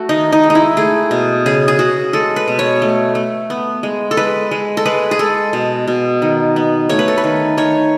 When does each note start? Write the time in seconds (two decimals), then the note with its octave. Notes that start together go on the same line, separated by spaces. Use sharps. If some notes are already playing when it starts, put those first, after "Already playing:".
Already playing: A3 F#4
0.09 D#3 D#4
0.32 D#4
0.44 G#3
0.50 D#4
0.55 E4
0.77 A3 G#4
1.11 B2
1.46 C#3 G#4
1.68 G#4
1.79 C#3 F#4
2.13 G#3 A4
2.36 B4
2.48 B2
2.59 C#5
2.82 A3
3.15 A3
3.50 B3
3.83 G#3
4.11 A4
4.17 G#3 B4
4.51 G#3
4.77 A4
4.86 G#3 B4
5.11 G#4
5.19 G#3 A4
5.53 B2
5.88 B2
6.22 D#3
6.56 B3
6.89 A3 C#5
6.99 B4
7.08 A4
7.18 B4
7.24 D#3
7.58 D#3 C#5